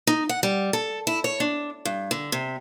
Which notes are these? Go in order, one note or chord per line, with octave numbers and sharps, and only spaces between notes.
D#4
F#5
G3
A4
E4
C#5
D4
G2
D3
C3